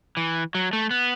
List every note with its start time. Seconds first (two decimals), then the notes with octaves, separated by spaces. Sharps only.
0.17 E3
0.55 F#3
0.73 A3
0.91 B3